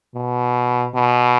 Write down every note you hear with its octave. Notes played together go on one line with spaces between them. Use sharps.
B2
B2